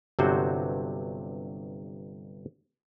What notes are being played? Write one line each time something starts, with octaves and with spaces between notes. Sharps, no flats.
G1 G2 C3 F#3 F#4 C5